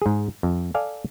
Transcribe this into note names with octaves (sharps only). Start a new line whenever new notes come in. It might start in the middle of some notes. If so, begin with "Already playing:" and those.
G#2 G#4
F2
A4 D5 F5 G#5